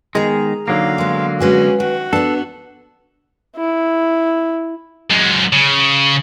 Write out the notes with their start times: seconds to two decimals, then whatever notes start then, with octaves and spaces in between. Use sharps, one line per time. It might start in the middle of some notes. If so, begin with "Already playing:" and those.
0.15 D#3 G#3 B3 G#4 A#5
0.68 D3 F#3 A#3 D#4 F5
0.98 G#3 B3 C6
1.40 G#3 C#4 F#4 G#4 B4
1.80 D#3 F#4
2.13 B3 D4 A4 B4
3.57 E4
5.11 F#2 G#3
5.53 C#3